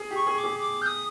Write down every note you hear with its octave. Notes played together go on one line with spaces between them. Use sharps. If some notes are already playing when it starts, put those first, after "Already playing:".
Already playing: G#4
G4
C#6
G#4
D6
G#4
D6
G6
D#6